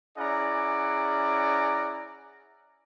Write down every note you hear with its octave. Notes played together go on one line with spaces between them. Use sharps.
C#4 E4 G#4 D5 F#5 A#5